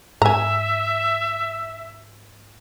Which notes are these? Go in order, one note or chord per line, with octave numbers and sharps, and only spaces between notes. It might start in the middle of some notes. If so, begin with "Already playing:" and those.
G#2 E5 G#5 A#5